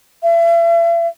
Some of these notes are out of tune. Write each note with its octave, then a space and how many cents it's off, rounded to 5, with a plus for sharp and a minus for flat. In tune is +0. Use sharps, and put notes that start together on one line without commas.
E5 +40